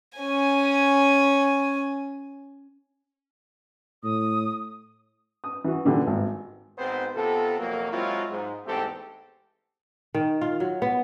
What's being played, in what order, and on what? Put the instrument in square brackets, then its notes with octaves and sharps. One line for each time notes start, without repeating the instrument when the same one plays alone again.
[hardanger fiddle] C#4 G#5
[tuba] A2 [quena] D#6
[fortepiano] D#6
E3 F#4
A#2 D3 E3 G3
G#1
[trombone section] G#1 G#2 B3 C4 B4 C5
C3 B3 F4 A4
F2 C3 F#3 A#3
F#3 G#3 C4 E4 F4
G#2
E2 G#2 A3 C4 G4 A4
[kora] D#3
F4
F#3
B3